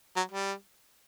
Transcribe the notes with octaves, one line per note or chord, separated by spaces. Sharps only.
F#3
G3